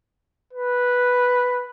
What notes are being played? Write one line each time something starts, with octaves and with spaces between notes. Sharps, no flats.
B4